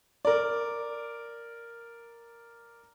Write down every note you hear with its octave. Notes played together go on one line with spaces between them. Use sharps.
A#4 D5